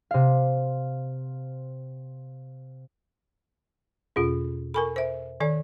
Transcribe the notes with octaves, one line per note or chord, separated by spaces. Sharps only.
C3 F5
E2 B2 C#4 F4 G#4
A4 A#4 G#5 B5 C#6
C5 E5
D#3 A4 D5 G#5